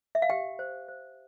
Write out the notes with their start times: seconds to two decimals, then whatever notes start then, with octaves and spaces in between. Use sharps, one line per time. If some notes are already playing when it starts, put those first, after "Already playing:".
0.15 E5
0.22 F5
0.29 G4 G5
0.59 C5
0.88 C5